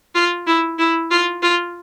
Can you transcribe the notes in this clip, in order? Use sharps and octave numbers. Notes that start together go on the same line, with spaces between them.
F4
E4
E4
F4
F4